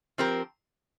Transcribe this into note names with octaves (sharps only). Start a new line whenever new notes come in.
F3 C4 G4 A#4